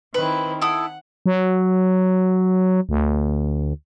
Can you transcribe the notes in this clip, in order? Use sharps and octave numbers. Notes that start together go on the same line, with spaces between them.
D#3 C4 E4 B4
E4 A4 F#5 D#6
F#3
D2